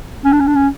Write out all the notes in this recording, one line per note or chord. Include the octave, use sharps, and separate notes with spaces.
C#4
D4
C#4
D4
C#4